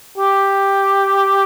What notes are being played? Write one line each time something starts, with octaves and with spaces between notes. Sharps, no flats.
G4